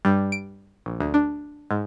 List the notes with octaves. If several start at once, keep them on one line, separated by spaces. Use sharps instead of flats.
G2
D7
A#1
D2
D4
G#2